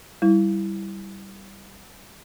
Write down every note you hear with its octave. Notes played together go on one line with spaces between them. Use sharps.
G3 E4